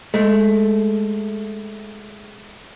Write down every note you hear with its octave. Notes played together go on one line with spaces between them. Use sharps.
G#3 A3